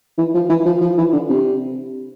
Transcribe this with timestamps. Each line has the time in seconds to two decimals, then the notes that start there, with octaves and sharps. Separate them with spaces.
0.18 E3
0.34 F3
0.49 E3
0.65 F3
0.81 F3
0.98 E3
1.13 D3
1.29 C3